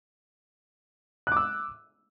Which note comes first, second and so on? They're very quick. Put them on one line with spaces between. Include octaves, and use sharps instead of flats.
F#6 D6 E6